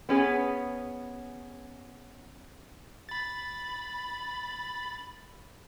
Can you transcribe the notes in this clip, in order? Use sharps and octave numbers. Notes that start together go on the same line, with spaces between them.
B3 C#4 G#4
B5 A6